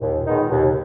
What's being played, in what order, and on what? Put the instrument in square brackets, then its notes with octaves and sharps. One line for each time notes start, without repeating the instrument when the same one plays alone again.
[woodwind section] D#2 [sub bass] A#2
[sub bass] A#2 [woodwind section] D#3 G#3 B3 D#4
[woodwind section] D#2 [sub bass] B2
[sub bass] C#3